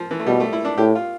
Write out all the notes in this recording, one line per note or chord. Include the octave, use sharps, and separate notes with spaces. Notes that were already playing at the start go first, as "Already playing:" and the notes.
Already playing: F3
E3
A3
B2 G3
A3
E4
D4
A2 G4
F4